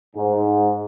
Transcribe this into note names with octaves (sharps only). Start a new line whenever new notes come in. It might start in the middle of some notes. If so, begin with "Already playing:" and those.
G#2